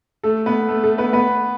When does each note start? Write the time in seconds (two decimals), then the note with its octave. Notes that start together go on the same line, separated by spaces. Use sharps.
0.23 A3 A4
0.46 B3 B4
0.68 A3 A4
0.83 A3 A4
0.98 B3 B4
1.13 B3 B4